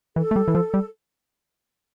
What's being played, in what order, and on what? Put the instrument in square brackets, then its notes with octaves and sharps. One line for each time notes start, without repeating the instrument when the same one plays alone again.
[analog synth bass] E3 [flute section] A4
[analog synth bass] A3
G3
E3
F3
G3